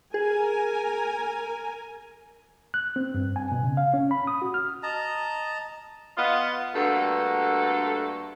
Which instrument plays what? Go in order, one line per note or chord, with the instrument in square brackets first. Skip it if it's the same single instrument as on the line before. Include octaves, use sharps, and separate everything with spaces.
[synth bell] G#4 [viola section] A#4 G#5
[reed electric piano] F#6
C4
G2
G#5
B2
C#3
F5
C#4
B5
D#6
F#4
F6
[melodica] D#5 A5 A#5
[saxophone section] B3 F4 D#5
G2 D3 A3 A#3 F#4 A4